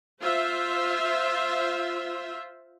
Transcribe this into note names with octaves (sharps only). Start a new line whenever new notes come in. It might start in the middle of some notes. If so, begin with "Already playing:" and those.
F4 C5 E5